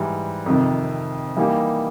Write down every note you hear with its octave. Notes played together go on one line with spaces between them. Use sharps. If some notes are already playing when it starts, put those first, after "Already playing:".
Already playing: G#2 E3 G3
F2 C3 D#3
E3 G3 A#3 D#4 G4